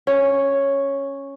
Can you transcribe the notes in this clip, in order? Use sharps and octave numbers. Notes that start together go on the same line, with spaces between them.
C#4